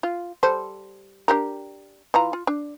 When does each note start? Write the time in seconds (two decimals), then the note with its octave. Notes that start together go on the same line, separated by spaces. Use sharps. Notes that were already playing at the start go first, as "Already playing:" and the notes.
0.03 F4
0.43 G3 A4 C5
1.28 D4 G4 A#4
2.14 E3 F4 A#5
2.33 F4
2.47 D4